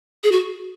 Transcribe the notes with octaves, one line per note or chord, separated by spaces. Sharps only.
G#4
F#4